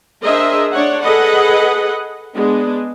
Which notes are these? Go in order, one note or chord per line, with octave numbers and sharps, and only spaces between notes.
D4 G#4 A#4 C5 D#5 E5
D4 C#5 F#5
G#4 A4 B4 D#5 F#5
G#3 B3 D4